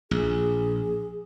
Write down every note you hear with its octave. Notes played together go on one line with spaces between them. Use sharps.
A#1 G#4